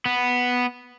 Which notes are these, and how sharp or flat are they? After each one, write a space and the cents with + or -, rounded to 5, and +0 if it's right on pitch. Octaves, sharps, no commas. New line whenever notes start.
B3 +0